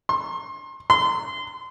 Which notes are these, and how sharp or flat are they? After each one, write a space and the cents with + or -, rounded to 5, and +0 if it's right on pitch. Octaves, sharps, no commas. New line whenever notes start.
C6 +30
C6 -25